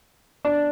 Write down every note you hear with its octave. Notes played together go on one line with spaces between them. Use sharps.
D4